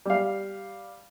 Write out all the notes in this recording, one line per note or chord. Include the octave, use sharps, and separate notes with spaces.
G3 F5